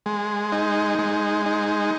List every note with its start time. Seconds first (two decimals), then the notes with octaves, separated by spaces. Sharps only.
0.06 G#3
0.52 D#4
0.99 G#3
1.46 D#4